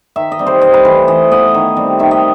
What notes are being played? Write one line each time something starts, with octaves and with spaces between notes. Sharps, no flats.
D#3 E5
D#5
G3 C4
C5
C3 D#5
B4
E3 A3 C5
E3 D#5
B3 E4 D#5
D#3
G3 C4
D#3 E5
D#5